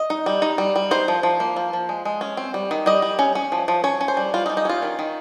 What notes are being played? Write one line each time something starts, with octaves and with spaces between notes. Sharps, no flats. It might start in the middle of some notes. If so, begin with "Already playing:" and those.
Already playing: D#5
D#4
G3
D#4
G3
G3
D#4 C5
F3
F3
A#3
F3
F3
G#3
G#3
C#4
C4
G3
D#3
G3 D#5
G3
C#4
C#4
F3
F3
C#4 C#5
C#4
C5
G3
G3 F4
D#4
G3
D#4
C#4 F4
D#3
D#3